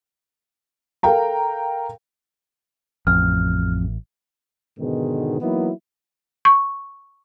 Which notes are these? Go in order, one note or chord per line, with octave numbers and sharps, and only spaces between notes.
A4 A#4 F5 G5 A#5
A1 F2 F6
G#2 B2 D3 D#3 G#3 B3
E3 F#3 A#3 B3 D#4 E4
C#6